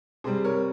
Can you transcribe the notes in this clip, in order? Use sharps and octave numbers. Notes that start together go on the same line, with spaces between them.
C3 G3 C4 G#4 C5
A#4 C#5